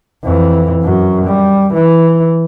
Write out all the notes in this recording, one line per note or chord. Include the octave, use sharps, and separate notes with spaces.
F2 E3
F#2 F#3
G3
E3